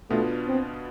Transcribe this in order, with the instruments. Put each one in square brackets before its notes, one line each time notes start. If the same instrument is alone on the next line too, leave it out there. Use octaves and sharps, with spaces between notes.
[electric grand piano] B2 B3 D4 F4 [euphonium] A3
[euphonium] C4